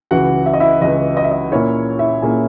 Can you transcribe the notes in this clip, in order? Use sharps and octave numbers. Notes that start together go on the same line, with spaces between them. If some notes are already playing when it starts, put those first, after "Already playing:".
C#2 C#3 E3 F#4 F#5
E5
D#5
E4 E5
C#2 C#3 E3 D#5
D#5
E5
D#5
A#2 A#3 C#4 E4 C#5
E4 E5
A#2 A#3 C#4 E4 G#4 G#5